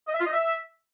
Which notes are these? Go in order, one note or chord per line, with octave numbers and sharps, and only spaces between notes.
D#5
E5
F4
D#5
E5